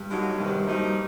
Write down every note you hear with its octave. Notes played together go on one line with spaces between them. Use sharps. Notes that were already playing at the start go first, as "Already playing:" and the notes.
Already playing: G2
D3 F#3 A#3 D#4 F#4
E2 G2 C3 D#3
G2 F3 A#3 D#4 F#4